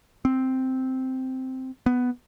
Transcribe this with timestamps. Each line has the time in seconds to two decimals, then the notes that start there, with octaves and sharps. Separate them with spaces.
0.25 C4
1.86 B3